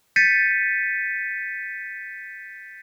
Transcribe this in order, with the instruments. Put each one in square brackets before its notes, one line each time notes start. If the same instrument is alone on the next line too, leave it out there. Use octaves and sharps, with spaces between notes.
[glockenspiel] G6 A6 B6 C#7 D#7